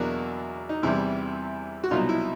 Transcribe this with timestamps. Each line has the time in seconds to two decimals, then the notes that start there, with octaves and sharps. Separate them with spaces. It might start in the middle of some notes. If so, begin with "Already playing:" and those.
Already playing: E2 B2 F#3 A#3 D4 E4 F#4
0.69 D#4
0.83 E2 C3 E3 G3 E4
1.84 F#4
1.91 C2 B2 F#3 D#4 F4
2.09 E4